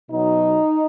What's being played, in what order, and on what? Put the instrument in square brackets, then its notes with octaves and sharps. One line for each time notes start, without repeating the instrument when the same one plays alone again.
[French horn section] B2 F#3 D#4